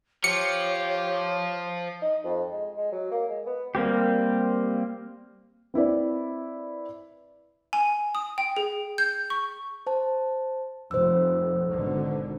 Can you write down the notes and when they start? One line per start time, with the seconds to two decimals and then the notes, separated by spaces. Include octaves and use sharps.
0.24 F3 F4 G4 C#5 C#7
2.02 D#4
2.24 F2
2.52 G#3
2.77 G#3
2.92 F#3
3.11 A#3
3.29 G#3
3.46 B3
3.75 G3 A#3 C4 G4
5.74 C4 E4 B4 D5
7.73 G#5
8.15 D#6
8.38 G5
8.57 G#4
8.98 G6
9.30 C#6
9.87 C5 A5
10.91 F1 C5 E6
11.71 G#1 B2 D3